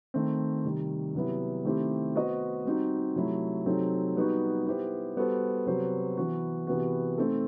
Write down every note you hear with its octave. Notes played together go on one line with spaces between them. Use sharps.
D#3 A3 C4
C3 D#3 G3
C3 F#3 B3 E4
D#3 A3 C4 E4 G4
B3 F#4 C5 D#5
G3 C4 D#4 F#4
C3 F#3 A3 E4
C3 F#3 C4 D#4 A4
G3 B3 D#4 F#4
B3 E4 G4 C5
G3 B3 F#4 A4 C5
C3 F#3 B3 F#4 C5
E3 B3 F#4
C3 E3 B3 F#4
A3 C4 D#4 A4